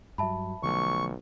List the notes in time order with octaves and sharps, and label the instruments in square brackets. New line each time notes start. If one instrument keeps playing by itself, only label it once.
[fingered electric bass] G2 F#3 [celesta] E5 A5 B5
[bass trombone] B1 [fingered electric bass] D3 F3 A3 [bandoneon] C#6